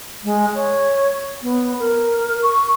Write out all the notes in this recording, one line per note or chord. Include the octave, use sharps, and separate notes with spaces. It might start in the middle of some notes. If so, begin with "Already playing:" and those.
G#3
C#5
B3
A#4
C#6